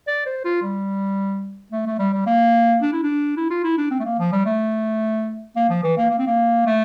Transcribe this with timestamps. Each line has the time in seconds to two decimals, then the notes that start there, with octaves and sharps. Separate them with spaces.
0.08 D5
0.26 C5
0.45 F4
0.63 G3
1.72 A3
1.86 A3
1.99 G3
2.13 G3
2.26 A#3
2.82 D4
2.93 E4
3.03 D4
3.37 E4
3.50 F4
3.64 E4
3.78 D4
3.91 C4
4.00 A3
4.05 A#3
4.19 F3
4.32 G3
4.46 A3
5.56 A#3
5.69 F3
5.83 E3
5.98 A#3
6.11 A#3
6.19 C4
6.27 A#3
6.66 A3